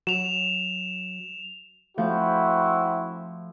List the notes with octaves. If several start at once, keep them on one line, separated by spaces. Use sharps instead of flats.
F#3 E7 F7
F3 A3 C4 E4 F#4 G6